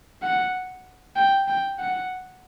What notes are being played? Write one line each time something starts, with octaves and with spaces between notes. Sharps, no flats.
F#5
G5
G5
F#5